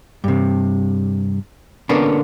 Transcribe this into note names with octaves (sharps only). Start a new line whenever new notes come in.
G2 C3
D3 A#3 B3 C#4 D4